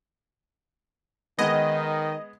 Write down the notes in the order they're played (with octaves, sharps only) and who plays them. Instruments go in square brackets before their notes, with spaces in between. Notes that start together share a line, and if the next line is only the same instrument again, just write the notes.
[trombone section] D#3 [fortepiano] G#3 B3 [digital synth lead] D#5